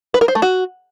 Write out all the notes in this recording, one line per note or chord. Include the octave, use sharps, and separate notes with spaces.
B4
A#4
C5
A3
F#4